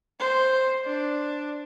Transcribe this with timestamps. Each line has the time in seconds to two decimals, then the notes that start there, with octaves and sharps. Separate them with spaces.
0.20 C5
0.85 D4